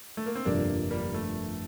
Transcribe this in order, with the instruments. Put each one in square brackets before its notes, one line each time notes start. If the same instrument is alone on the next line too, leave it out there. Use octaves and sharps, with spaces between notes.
[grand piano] A3
A#3
C4
[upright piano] G1 F2 C3 [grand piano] A#3 D4
[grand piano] G3 A#3
A3